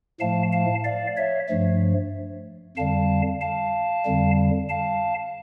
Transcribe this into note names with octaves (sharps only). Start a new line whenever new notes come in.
A2 F3 A3 F5 A5
F5 A5
D5 F5
C#5 E5
G2 F3 A3
F2 D3 G3 F5 A5
F5 A5
F2 D3 G3
F5 A5